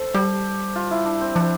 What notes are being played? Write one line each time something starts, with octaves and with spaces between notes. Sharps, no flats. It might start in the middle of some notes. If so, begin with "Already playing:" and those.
Already playing: A4 C5
G3 G4
F4
E4
D4
C4
F3 D4